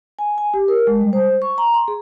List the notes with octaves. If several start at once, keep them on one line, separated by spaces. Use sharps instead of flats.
G#5
G#5
G4
A#4
G#3
G3
C5
C#6
A#5
C6
G#4